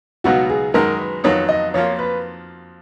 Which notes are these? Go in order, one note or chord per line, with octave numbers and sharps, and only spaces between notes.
C#2 B2 F#3 B3 D#4 F#4
G#4
F#2 D#3 G#3 D#4 F#4 A#4
B4
F2 D#3 F#3 B3 D#4 C#5
D#5
F2 F3 A#3 F4 C#5
B4